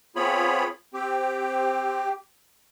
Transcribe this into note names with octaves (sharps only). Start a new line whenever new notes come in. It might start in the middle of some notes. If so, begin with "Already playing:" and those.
B3 C4 F4 G#4 C#5 B5
C4 G4